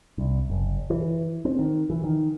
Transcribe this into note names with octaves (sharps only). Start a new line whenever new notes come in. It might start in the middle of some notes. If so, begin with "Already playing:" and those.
C2
F#1
E3
C4
D#3
E3
D#3